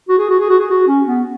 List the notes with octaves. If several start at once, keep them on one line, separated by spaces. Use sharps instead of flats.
F#4
G#4
F#4
G#4
F#4
G#4
F#4
C#4
B3